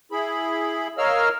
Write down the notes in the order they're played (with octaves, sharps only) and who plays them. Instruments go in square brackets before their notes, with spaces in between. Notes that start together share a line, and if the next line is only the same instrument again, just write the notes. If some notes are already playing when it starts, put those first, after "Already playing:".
[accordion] E4 G#4 B5
A#4 C#5 D#5 F5 E6 F6